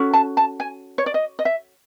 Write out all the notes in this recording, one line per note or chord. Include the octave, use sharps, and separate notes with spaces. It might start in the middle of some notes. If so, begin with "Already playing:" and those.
Already playing: C#4 F#4 A4
A5
A5
G#5
C#5
D5
D#5
D#5
E5